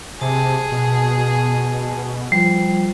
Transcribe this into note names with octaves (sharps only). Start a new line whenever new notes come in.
C3 G#4 A5
B2
F3 G3